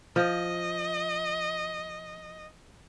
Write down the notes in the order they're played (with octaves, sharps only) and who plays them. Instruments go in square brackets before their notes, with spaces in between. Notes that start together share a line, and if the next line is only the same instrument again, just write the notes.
[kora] F3 [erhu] D#5